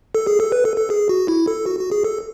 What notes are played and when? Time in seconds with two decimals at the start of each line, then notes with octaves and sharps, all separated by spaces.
0.15 A4
0.27 G#4
0.40 A4
0.52 B4
0.65 A4
0.77 A4
0.90 G#4
1.09 F#4
1.28 E4
1.48 A4
1.66 F#4
1.79 F#4
1.91 G#4
2.04 A4